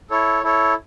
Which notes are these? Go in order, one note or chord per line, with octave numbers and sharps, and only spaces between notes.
E4 A4 C#5
E4 A4 C#5